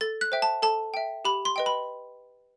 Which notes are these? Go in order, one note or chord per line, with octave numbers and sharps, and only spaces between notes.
A4 A6
F#6
C5 E5 G5
A5
A4 A5
E5 G5
G4 B5
C6
B4 D#5 G5
B5